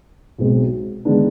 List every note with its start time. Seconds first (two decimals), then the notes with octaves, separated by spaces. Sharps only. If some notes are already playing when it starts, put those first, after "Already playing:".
0.38 B1 B2 G#3 C4
1.05 D#3 G#3 B3 D4